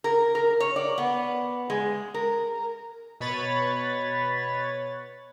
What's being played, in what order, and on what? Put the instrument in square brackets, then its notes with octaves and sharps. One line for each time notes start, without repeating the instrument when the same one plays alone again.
[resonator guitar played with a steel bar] A#4
A#4
C#5
D5
B3
G#3
A#4
[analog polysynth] B2 B4 C#5 B5 A6